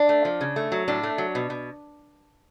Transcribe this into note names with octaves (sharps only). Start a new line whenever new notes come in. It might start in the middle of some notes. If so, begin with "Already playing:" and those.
Already playing: D4
A3
F3
C#3
A3
F#3
A2 D4
A3
F#3
B2
B2